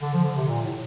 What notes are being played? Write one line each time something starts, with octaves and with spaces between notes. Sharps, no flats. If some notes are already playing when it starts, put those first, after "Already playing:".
D3
F3
D3
C3
A#2
A2